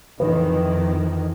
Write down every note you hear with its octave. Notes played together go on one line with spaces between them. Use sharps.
F2 D#3 E3 B4